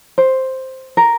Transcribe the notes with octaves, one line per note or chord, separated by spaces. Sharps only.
C5
A#4